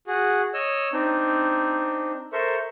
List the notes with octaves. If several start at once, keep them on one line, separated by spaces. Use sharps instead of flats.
F#4 G#4
C#5 D#5 E6
C4 D4 D#4
A4 A#4 C5 E5 C#6